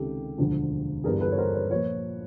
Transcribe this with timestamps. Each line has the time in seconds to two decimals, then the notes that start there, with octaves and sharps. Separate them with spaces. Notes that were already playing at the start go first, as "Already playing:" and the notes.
Already playing: C#2 C3 D#3 G4 A4
0.38 E1 D2 D3 F3
1.04 G1 G2 E3 G#4 A#4
1.20 A4 B4
1.31 C#5
1.38 A#4 C5
1.54 B4 C#5
1.70 A#2 F3 B4 C#5